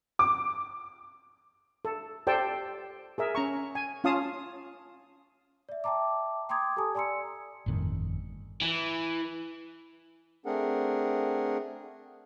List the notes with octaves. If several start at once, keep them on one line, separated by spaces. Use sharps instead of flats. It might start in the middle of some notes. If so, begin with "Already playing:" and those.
D6
A4
G4 A4 C5 D5 G5 A5
G#4 A#4 E5
C#4 A#5 C#6
G#5
C#4 F4 F5 A5 D#6
D5 E5
E5 G5 A5 A#5 D6
G5 A#5 C6 D6 D#6 G#6
G4 A4 G#5 A5 D#6
D5 G#5 A#5 C6 E6 C#7
G1 F2 A2 D#3
E3
A3 C4 D4 G#4 A#4 F#5